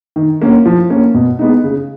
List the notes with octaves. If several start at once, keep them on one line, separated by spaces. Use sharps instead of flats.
D#3
A#3 C#4
F3
A#3 C#4
B2
G#3 B3 D#4
C#3